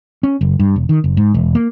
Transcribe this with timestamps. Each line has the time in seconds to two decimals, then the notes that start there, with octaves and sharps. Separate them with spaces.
0.23 C#4
0.41 F#1
0.59 G2
0.76 E1
0.89 D#3
1.04 F#1
1.17 G#2
1.34 E1
1.55 A#3